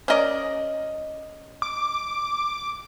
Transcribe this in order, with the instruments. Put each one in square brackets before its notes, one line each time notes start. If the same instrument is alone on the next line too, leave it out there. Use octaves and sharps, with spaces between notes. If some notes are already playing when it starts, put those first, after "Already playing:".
[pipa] C#4 A#4 D5 [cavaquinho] D#5 D#6
[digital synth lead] D6